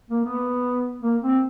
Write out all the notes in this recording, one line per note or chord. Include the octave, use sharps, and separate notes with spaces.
A#3
B3
A#3
C4